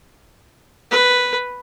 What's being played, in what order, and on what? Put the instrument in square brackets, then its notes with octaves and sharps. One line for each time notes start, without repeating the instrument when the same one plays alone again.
[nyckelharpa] B4